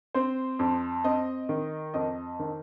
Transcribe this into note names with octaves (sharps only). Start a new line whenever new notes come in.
C4 C5
F2
C4 D#5
D#3
F2 D#5
D#3